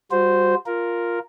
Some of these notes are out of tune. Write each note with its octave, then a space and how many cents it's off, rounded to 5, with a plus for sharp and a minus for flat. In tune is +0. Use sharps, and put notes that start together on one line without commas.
G3 +0 F#4 -30 C5 -10
F4 +0 A#4 +0